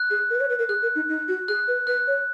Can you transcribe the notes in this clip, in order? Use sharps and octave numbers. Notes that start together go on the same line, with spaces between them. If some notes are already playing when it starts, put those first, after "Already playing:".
Already playing: F#6
G#4
A#4
B4
C#5
B4
A#4
G#4 F#6
A#4
D#4
D#4
F#4
G#4 F#6
B4
B4 F#6
C#5